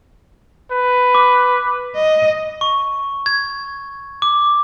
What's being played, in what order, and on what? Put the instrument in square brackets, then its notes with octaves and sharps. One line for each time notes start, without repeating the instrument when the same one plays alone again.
[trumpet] B4
[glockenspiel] D6
[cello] D#5
[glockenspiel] C#6
G#6
D6